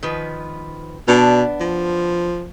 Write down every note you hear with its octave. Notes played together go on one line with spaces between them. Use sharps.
D#3 F3 B4
B2 B3 D4
F3